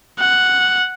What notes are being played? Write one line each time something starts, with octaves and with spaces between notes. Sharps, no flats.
F#5